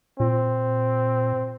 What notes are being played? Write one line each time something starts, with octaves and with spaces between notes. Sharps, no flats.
A#2 C4